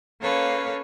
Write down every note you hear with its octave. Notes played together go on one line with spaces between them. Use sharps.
A#3 C#4 A4 B4 C#5 F5